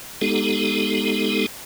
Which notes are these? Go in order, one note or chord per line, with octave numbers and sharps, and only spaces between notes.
G#3 B3 D#4 G4 A4